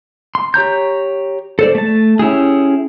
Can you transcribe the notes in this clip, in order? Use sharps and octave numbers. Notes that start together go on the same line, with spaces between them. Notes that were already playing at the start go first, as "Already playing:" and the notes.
C6
G4 C#5 A#5 G6
A4 C5 D5
A3 A5
C#4 E4 G4 G#4